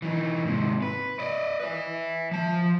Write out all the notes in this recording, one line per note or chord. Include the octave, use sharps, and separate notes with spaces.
E3 D#4
G#2 C3
B4
D5 D#5
B4 E5
F3 A5